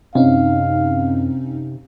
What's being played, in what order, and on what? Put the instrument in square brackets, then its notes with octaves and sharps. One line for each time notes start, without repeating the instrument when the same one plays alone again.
[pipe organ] F#2 [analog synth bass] C3 [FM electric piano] C4 C#4 D#4 [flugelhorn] F5